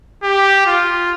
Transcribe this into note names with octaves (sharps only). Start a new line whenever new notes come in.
G4
F4